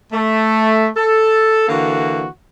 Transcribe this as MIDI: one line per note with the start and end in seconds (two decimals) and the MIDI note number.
0.12 0.87 57
0.96 1.68 69
1.68 2.26 50
1.68 2.26 52
1.68 2.26 58
1.68 2.26 66